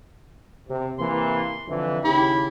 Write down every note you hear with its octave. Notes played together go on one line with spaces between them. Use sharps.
C3
C3 E3 A#3 C6
F2 D3 E3
D#2 C#3 E4 G4